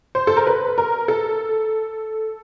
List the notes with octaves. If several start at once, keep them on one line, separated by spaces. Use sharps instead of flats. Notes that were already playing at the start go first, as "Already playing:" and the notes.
C5
A4
A#4
B4
A#4
A4